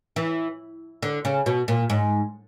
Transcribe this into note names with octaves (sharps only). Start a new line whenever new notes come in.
E3
D3
C#3
B2
A#2
G#2